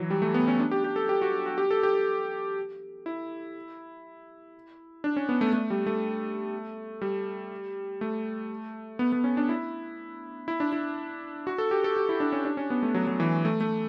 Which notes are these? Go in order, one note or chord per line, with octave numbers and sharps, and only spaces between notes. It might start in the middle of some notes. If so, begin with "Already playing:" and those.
Already playing: E3 F#3
G3
A3
B3
C#4
D4
G4
G4
A4
G4
F#4
F#4
G4
A4
G4
A4
E4
D4
C#4
B3
A3
A3
G3
A3
G3
A3
B3
B3
C#4
D4
E4
E4
D4
E4
F#4
A4
G4
A4
G4
E4
D4
C#4
D4
C#4
B3
A3
F#3
F#3
E3
A3
A3